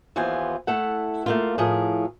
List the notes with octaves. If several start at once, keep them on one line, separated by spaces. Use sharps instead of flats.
D#2 E3 B3 F4 C5 G#5
A3 E4 A4 F#5
A3 A#3 F4
A2 F3 G#4 A#4